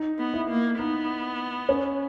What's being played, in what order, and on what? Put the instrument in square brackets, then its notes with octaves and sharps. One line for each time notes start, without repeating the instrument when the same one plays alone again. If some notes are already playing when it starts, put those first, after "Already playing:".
Already playing: [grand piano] D#4
[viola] B3
[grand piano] E4
[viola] A#3
[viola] B3 [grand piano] D#4
[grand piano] C#4